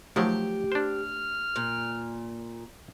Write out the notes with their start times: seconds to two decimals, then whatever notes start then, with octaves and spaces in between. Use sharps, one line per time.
0.16 D#3 F3 F#3 A3 G4
0.72 D4 C5 F6
1.56 A#2